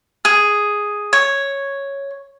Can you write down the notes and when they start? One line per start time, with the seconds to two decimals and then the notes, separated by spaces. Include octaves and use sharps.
0.25 G#4
1.13 C#5